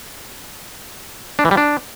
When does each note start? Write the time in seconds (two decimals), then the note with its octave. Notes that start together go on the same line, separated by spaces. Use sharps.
1.39 D4
1.45 E3
1.51 G3
1.57 D4